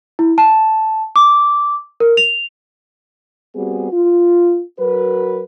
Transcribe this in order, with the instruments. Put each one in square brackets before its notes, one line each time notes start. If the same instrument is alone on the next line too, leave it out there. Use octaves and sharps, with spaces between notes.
[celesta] E4
A5
D6
A#4
F7
[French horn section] G3 B3 C4 F#4 G#4
F4
F#3 F#4 A#4 B4